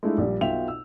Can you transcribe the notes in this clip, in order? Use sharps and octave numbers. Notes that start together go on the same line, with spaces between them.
G#3 A3 D4 E4 F4
A#1 G3
B1 B2 F4 E5 G5 F7
E6